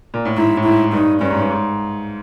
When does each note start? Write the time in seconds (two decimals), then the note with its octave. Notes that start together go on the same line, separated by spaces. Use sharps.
0.14 A#2
0.25 A2
0.37 G#2 E4
0.57 A2
0.65 G#2 E4
0.93 G2 D#4
1.21 G2 C#4
1.31 G#2
1.41 G2
1.50 G#2